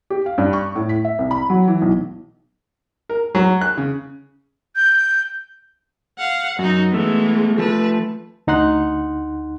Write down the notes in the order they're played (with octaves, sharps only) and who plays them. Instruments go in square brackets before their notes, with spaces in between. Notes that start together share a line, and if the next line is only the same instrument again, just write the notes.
[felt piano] G4
F5
G2
C#6
A2
B6
E5
C2
B5
F#3
E3
B1
[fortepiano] A#4
F#3
F#6
C#3
[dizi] G6
[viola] F5 F#5
[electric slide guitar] F#2 [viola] D#4 F#4
[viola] E3 G#3 [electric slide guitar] A3 B3
[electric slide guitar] F3 A3 [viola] B4
[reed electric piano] D2 D#4 F#5 C6 F#6